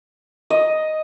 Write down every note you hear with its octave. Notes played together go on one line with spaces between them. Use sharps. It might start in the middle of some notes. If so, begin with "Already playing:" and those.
D#5